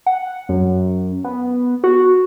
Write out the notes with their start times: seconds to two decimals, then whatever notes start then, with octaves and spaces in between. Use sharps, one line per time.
0.06 F#5
0.49 F#2
1.24 B3
1.84 F#4